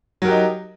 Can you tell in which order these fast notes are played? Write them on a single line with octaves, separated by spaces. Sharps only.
F#3 A#4 G4 D#4